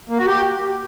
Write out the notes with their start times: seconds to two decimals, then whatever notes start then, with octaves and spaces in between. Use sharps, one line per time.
0.10 A#3
0.18 F#4
0.27 G4